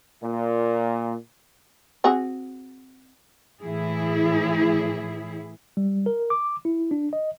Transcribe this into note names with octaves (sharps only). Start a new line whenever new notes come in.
A#2
C4 F#4 G#4
A2 E3 E4 G#4
G3
A#4
D6
E4
D4
D#5